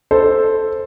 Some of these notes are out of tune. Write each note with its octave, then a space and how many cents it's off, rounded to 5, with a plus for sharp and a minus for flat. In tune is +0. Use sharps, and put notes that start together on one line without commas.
A4 +0 C5 +0